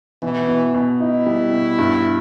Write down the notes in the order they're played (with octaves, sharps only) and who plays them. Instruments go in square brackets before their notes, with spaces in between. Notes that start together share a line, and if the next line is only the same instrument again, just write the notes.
[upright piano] B2 [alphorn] E3
[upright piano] B2
B2
[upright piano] D#4 [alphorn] E4
[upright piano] G3
B2
G2